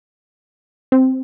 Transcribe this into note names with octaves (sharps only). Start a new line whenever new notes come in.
C4